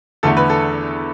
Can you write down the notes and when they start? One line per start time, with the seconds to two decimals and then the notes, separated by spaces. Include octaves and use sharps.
0.23 E2 D3 A3 A4
0.37 B4
0.50 A4